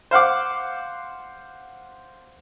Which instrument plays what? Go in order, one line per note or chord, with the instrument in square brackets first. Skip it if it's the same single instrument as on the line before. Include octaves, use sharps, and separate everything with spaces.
[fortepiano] C5 F5 F#5 D6